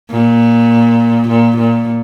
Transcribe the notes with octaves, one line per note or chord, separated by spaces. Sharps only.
A#2
A#2
A#2